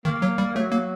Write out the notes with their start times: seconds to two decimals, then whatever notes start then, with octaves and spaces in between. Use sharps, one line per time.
0.05 D#3 A#3
0.22 F#3
0.38 G3
0.55 F#3 A3
0.72 A#3